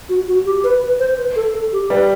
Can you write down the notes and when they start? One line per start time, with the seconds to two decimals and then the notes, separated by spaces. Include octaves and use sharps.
0.09 F#4
0.28 F#4
0.45 G4
0.64 B4
0.82 B4
0.99 C5
1.18 B4
1.36 A4
1.54 A4
1.73 G4
1.90 G3 B4